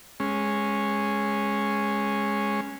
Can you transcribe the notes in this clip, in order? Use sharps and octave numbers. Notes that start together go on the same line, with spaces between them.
G#3 C#4